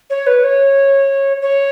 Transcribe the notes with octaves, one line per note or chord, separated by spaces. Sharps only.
C#5
B4
C#5
C#5